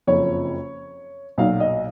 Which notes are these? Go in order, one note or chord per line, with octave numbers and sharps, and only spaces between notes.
F#1 F2 F3 C#5
B1 A#2 F#3 F5
D#5